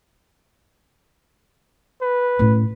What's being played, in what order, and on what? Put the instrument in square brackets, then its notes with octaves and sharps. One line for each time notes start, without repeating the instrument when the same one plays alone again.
[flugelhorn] B4
[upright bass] A2 C#4